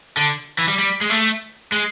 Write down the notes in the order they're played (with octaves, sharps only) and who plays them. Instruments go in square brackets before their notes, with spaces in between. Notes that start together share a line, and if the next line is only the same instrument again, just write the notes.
[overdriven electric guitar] D3
E3
G3
G3
G#3
A3
G#3